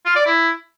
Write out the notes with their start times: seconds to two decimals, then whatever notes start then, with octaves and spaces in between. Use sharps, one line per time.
0.06 F4
0.16 D5
0.26 E4